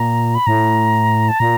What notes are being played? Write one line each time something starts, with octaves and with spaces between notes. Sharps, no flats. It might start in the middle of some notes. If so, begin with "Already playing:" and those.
Already playing: A#2 A#5
B5
A2 A#5
A5
A#2 A#5